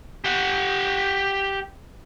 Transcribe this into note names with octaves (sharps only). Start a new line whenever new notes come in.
G4 F#5